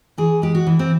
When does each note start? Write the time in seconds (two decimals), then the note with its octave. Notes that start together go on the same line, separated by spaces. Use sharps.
0.18 E3 G#4
0.42 G#3 G4
0.55 F#4
0.67 E3
0.79 C4